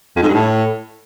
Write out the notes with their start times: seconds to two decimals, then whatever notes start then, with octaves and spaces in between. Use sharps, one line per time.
0.16 F2
0.22 G#2
0.28 G2
0.34 A2